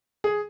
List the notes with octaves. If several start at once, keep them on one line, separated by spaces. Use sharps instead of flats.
G#4